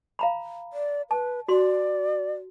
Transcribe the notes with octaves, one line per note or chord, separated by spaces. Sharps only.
F5 A#5 B5
D5
B4 A5
F#4 D5 C6